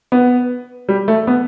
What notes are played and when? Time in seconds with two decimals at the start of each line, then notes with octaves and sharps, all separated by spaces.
0.12 B3
0.89 G3
1.08 A3
1.27 B3